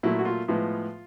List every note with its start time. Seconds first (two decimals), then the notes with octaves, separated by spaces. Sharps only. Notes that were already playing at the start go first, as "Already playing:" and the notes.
0.03 A#2 F#3 A3 E4
0.19 F#4
0.25 F4
0.48 A2 F3 G#3 B3 F4